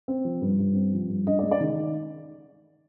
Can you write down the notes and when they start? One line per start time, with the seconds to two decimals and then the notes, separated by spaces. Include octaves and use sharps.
0.08 C4
0.25 F3
0.41 G2
0.59 G2
0.75 C4
0.93 F3
1.09 G2
1.27 D4 D#5
1.39 D5
1.43 G#3
1.51 D5
1.61 D#3